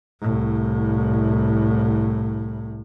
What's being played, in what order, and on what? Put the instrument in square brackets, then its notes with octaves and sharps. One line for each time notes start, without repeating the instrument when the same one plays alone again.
[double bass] C2 A2